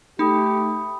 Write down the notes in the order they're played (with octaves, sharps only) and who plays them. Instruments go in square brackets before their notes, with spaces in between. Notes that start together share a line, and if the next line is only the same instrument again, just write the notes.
[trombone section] A3 G4 [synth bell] D#4 [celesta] B5 D#6